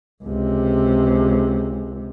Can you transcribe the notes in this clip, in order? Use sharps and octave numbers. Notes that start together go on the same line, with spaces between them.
C#2 C3